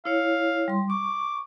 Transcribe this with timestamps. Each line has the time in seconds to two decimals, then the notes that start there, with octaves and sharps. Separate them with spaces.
0.05 E4 C#5 F5
0.68 G3 C6
0.90 C#6 D6